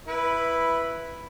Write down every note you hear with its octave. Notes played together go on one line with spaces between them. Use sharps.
E4 B4